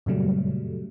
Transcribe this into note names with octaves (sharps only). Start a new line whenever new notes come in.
F#2 A#2 C#3 F#3 G3 A3